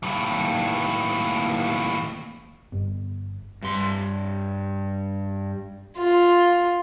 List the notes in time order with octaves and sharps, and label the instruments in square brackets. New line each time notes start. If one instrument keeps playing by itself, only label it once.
[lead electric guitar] D#2 A2
[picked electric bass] G1
[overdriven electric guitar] G2 C6
[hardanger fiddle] F4